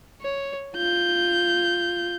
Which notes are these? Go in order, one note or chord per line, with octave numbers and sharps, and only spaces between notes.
C#5
F4 G6